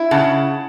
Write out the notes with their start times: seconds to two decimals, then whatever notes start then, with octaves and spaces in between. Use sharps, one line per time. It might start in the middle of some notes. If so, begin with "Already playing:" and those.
Already playing: E4
0.11 C#3 F#5 A5